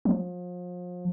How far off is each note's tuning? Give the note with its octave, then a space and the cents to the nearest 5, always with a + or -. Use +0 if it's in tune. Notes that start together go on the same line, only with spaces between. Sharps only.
F3 +35